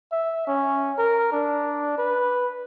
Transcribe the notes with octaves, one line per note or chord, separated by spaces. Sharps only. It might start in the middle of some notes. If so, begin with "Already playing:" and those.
E5
C#4
A#4
D4
B4